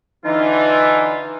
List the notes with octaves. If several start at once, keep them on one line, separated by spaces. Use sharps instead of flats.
D3 E3 D#4 F4